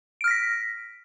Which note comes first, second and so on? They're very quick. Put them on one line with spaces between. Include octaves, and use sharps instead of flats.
D7 F6 A#6 B6